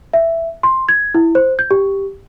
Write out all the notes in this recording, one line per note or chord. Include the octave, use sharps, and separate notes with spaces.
E5
C6
G#6
E4
C5
G6
G4